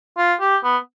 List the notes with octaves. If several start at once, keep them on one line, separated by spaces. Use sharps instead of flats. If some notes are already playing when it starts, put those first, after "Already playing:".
F4
G4
B3